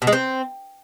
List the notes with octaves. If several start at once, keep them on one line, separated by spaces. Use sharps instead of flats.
B2
G#3
C4